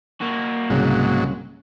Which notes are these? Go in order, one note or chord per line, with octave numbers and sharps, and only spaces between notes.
A#3 F#4
C2 G#2 C#3 F#3